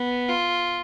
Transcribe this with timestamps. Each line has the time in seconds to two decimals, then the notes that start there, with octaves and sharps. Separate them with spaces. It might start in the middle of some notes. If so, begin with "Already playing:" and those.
Already playing: B3
0.29 F4